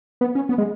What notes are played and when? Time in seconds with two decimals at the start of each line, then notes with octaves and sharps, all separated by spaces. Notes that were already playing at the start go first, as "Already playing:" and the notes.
0.21 B3
0.35 C#4
0.49 B3
0.58 G#3